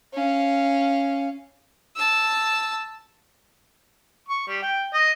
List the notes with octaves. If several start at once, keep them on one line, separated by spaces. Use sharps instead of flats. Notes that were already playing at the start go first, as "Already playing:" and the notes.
C#4 F5
A5 E6
C#6
G3
G5
D#5